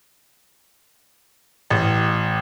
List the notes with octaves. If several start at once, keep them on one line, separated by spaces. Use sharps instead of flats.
A1